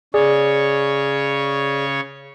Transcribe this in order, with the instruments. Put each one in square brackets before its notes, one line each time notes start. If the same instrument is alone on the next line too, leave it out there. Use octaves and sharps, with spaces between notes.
[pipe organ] C#3 C#5 [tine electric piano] G#4 D5